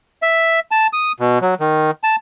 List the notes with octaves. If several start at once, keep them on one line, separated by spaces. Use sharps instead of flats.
E5
A5
D#6
B2
F#3
D#3
A5